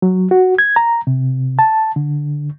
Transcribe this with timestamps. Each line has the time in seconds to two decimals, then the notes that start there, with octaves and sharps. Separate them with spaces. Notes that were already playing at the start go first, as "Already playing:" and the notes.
0.02 F#3
0.31 F#4
0.59 G#6
0.76 A#5
1.07 C3
1.59 A5
1.96 D3